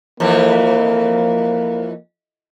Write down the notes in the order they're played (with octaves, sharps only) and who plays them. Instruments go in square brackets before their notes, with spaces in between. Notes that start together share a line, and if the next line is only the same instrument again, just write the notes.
[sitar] F2 E3 [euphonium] A#3